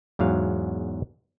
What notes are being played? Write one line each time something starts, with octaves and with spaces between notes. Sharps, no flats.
E2 G#2 F#3 F5